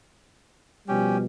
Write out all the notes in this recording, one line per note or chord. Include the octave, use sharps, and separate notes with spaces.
B2 F3 G3 C#4 G4